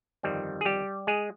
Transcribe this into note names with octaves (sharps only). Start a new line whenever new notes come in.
G1 F2 D#3 G3 C4
G#4
G3 G4
G#3 G#4